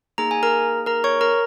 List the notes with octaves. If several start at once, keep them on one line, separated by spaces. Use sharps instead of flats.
A#3 D#4 G#4 A#5
G#5
A#4 A#5
A#4 A#5
C#5 C#6
A#4 A#5